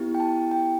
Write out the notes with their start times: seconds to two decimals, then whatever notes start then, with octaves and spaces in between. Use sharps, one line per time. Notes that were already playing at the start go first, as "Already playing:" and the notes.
Already playing: B3 E4 G4
0.15 G5
0.20 A5
0.51 G5